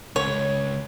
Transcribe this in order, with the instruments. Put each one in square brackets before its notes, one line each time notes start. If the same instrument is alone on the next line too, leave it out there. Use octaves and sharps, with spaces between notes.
[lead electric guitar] C#2 [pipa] C#5